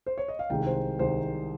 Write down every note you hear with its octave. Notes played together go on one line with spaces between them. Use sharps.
C5
C#5
D#5
F5
C2 C3 D#3 G#3 G5
C5
C2 C3 D#3 G#3 C5